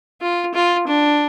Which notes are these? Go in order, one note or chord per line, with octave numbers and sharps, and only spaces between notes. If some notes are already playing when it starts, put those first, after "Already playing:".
F4
F4
D4